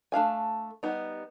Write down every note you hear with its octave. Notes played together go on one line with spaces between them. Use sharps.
A3 D4 F5 G#5
G3 B3 D#4